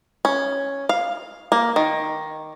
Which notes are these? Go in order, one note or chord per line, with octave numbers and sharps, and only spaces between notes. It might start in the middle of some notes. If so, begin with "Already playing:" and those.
C#4
F5
A#3
D#3